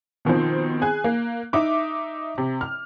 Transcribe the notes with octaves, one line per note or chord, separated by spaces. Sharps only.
B2 D#3 F3 C4
G#4 G#5 F#6
A#3
D#4 E5 D6
C3
F6